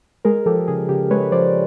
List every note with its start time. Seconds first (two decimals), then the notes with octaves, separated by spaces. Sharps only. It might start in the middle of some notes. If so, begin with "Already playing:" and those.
0.25 G#3 G#4 A#4
0.46 F3 G4 A4
0.68 C#3 G#4
0.89 C#3 G4
1.11 G#3 B4 C#5
1.32 F3 C5 D5